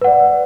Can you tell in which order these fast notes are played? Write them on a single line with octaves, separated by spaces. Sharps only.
B4 F#5 D5